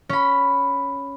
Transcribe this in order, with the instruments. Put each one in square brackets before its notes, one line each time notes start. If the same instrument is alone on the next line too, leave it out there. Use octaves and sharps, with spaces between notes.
[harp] C#4 B5